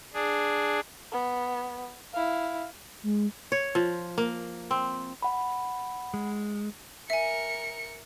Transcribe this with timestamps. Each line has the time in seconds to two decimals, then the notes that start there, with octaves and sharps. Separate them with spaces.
0.14 D4 G#4
1.12 B3
2.14 E4 F5
3.03 G#3
3.52 C#5
3.75 F3
4.18 A#3
4.71 C4
5.22 F#5 B5
6.14 G#3
7.10 A#4 E5 G#5 C#7